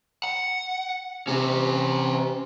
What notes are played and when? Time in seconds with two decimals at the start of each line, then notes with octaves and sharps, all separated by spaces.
0.24 F#5
1.28 C3 C#4 G4